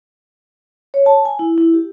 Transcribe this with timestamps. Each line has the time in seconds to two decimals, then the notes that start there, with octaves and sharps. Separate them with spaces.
0.94 C#5
1.06 A5
1.25 G#5
1.39 E4
1.58 E4
1.74 G4